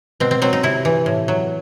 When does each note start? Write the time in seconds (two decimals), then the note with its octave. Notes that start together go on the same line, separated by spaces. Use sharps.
0.20 B2 C4
0.31 C4
0.42 F#3 C4
0.53 D#4
0.63 C3 E4
0.85 E3
1.06 A2
1.28 F#3